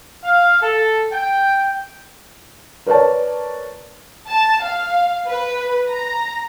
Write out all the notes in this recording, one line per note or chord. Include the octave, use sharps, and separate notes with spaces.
F5
A4
G5
A#4 B4 C#5 D5 A5
A5
F5
B4
A#5